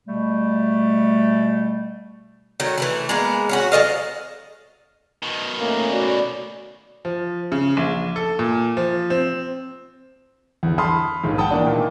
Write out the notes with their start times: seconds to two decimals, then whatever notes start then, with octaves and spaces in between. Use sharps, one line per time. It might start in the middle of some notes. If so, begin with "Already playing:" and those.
0.06 B2 G3 A3
2.60 D#3 F#3 A3
2.78 E3 A3 E4
3.09 G#3 A#3 B3
3.49 C#4 F4 F#4
3.72 F#3 A4 D#5 F5
5.23 B2 D#3
5.59 A3 A#3 C#4
5.91 F#4 D5
7.05 F3
7.52 C#3
7.77 A#1
8.16 A4
8.39 A#2
8.77 F3
9.10 C4
10.63 G1 E2
10.78 A5 B5 C6 D#6 F6
11.23 A#1 D#2 G#2
11.38 F#5 G5 A5 D#6
11.51 D#3 E3 A#3 D4 D5
11.66 A#2 D#3 E3